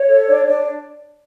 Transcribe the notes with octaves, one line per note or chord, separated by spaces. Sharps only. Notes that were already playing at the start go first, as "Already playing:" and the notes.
Already playing: C#5
A4
D4
D4